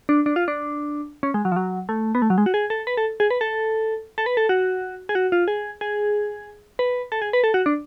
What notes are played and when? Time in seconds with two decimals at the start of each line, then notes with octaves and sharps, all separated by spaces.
0.09 D4
0.26 D4
0.36 F4
0.48 D4
1.23 C#4
1.34 G#3
1.45 F#3
1.52 F3
1.56 F#3
1.89 A3
2.15 B3
2.22 A3
2.30 F#3
2.38 G#3
2.46 F#4
2.54 G#4
2.70 A4
2.87 B4
2.97 A4
3.20 G#4
3.30 B4
3.41 A4
4.18 A4
4.26 B4
4.37 A4
4.49 F#4
5.09 G#4
5.15 F#4
5.32 F4
5.48 G#4
5.81 G#4
6.79 B4
7.12 A4
7.22 G#4
7.33 B4
7.44 A4
7.54 F#4
7.66 D4